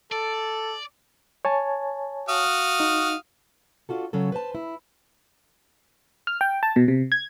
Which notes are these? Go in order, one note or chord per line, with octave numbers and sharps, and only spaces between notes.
A4 D5
C#5 G#5 A5
F#4 F5 D#6
D#4
D4 F4 F#4 A4
C#3 F#3 C#4 A4
B4 C5 A5
E4
F6
G5
A5
B2
C3
G#6